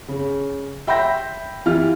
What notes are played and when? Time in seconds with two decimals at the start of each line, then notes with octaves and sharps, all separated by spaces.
0.08 C#3
0.87 E5 G5 B5 C6 G6 A#6
1.66 E3 E4 F4 G4 F6